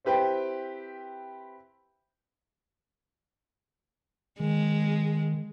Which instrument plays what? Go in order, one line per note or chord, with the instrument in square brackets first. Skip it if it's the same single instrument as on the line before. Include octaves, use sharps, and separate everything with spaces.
[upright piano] C4 E4 G4 B4 C5 G5
[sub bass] D#3 [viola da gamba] G#3